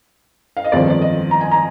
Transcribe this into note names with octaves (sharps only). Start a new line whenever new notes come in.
F5
D#5
G1 F2 D#3 G#3 C4 D5
D5
D#5
A#5
G#5
A#5